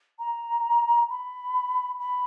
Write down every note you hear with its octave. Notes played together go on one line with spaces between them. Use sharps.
A#5
B5
B5